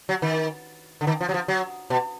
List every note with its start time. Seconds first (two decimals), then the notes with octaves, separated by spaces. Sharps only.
0.09 F#3
0.22 D#3
1.01 D3
1.07 D#3
1.21 F3
1.29 F#3
1.34 F3
1.48 F#3
1.90 B2